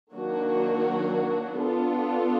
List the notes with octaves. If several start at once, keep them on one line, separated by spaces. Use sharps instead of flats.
D#3 F#3 A#3 D4 F#4
B3 D4 F4 A4